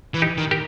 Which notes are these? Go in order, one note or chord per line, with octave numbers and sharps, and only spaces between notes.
E3
D#4 G4
D#3
G4 A#4